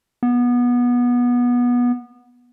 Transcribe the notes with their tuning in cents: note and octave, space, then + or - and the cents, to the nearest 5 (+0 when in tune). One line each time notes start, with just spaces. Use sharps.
B3 -20